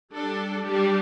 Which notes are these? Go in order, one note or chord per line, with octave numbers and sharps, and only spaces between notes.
G3 D4 A4
G3 D4 G4